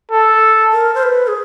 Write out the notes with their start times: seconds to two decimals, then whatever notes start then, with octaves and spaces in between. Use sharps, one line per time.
0.11 A4
0.72 A#4
0.95 C5
1.03 B4
1.27 G#4